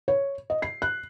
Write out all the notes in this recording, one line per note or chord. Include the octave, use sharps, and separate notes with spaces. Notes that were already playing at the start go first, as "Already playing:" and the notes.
C#5
D#5
C7
F#6